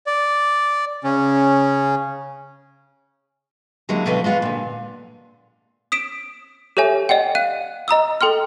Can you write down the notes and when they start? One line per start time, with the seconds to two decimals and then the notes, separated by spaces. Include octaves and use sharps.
0.07 D5
1.04 C#3 C#4
3.89 D3 F#3 G#3 A#3 E4 G4
4.05 B2 D3 F3 F#3 A3 B3
4.24 G#3 B3 F4 F#5
4.42 A#2 D3
5.92 D#6 B6 D7 E7
6.77 G4 A4 C#5 E5 G#5
7.09 D5 D#5 F#5 G5
7.35 F5 F#6 D#7
7.88 D#5 A#5 D#6 E6
8.21 A4 G5 C6 F6